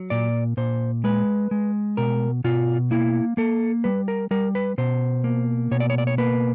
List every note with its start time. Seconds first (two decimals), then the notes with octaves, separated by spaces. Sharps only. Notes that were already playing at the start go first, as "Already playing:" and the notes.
Already playing: F#3
0.10 A#2 D5
0.57 A#2 C5
1.04 G#3 B4
1.51 G#3
1.97 B2 A#4
2.44 B2 F4
2.91 A#3 E4
3.37 A#3 A4
3.84 G3 B4
4.08 A#4
4.31 G3 A#4
4.55 B4
4.78 B2 C5
5.24 A#3
5.71 B2 C#5
5.80 D5
5.90 C#5
5.98 D5
6.07 C#5
6.18 A#3 B4